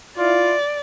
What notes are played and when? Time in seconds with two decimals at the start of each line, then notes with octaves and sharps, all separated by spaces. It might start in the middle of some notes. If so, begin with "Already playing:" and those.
0.18 E4 F4 D5